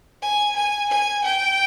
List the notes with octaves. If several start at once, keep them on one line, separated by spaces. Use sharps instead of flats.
G#5
G#5
G#5
G5